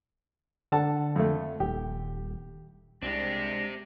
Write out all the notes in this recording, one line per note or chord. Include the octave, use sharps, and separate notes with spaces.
D3 A4 F#5 A5
F2 A3
D#1 G4
C2 G#3 C4 D4 G4 A#6